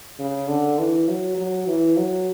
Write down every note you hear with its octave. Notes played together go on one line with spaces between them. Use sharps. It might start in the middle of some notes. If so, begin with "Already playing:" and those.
C#3
D3
E3
F#3
F#3
E3
F#3